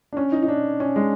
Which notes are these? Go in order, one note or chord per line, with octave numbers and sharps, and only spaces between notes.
D4
C#4
D#4
D#4
D4
C#4
G#3